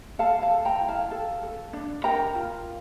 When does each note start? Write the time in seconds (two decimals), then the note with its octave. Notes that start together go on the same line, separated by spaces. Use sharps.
0.19 A4 F5 A5
0.42 F5 A5
0.50 A4
0.65 G5 A#5
0.81 E4
0.88 F5 A5
1.11 A4
1.43 A4
1.73 D4
2.04 A#4 G5 A#5
2.35 F4